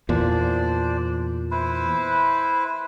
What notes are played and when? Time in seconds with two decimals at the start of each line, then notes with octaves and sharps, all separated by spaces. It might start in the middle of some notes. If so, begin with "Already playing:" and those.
0.09 E2 A#2 D4 C5 D5
1.51 E4 B4 C5